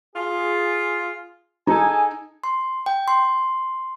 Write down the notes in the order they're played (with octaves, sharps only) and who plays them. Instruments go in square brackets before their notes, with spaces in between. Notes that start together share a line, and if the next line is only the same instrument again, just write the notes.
[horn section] F4 G#4
[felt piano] D#4 [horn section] G#4 A4 G#5
[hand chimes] C6
G5
C6